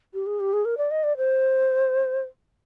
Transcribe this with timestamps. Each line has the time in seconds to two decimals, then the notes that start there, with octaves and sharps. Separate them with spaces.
0.14 G4
0.26 G#4
0.40 G4
0.53 G#4
0.65 A#4
0.77 D5
0.91 D#5
1.03 D5
1.17 C5